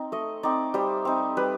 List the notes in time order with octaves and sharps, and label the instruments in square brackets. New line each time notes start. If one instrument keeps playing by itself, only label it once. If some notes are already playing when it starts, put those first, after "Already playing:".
Already playing: [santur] C4 D#4
A3 D#5
C4 D#4 D5
G3 C5
C4 D#4
G3 B4